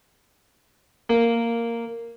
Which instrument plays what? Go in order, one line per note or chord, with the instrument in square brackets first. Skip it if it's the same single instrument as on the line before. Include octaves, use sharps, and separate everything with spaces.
[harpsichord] A#3